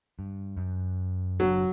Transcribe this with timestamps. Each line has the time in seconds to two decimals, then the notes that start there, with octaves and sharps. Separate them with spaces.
0.19 G2
0.57 F#2
1.40 F#1 F#3 D4